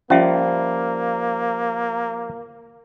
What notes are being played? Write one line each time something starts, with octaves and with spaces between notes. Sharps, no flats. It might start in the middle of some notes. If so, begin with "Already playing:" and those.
F3 G3 A#3 C#4 E5